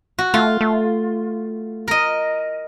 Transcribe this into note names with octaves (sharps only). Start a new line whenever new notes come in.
F#4
A3 F4
A3
A#4 D#5